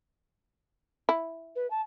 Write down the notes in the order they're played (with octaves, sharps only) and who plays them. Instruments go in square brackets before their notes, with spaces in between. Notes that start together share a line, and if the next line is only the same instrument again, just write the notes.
[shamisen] E4
[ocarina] B4
A5